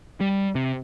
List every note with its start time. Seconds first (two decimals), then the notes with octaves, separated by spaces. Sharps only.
0.20 G3
0.55 C3